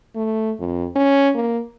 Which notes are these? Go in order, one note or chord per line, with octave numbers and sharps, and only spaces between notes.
A3
F2
C#4
A#3